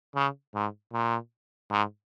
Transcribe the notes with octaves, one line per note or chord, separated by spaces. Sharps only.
C#3
G#2
A#2
G#2